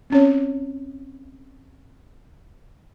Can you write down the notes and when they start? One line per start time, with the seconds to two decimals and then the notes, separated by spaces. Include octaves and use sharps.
0.10 C4 C#4 C#5